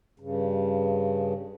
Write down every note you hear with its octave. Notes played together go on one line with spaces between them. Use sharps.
G2 C#3